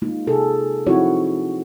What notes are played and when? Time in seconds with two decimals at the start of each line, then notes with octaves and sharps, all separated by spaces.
0.02 G#3 A#3 D#4 F4
0.27 C3 F4 G#4 A4
0.87 F3 C4 D#4 E4 F#4 C#5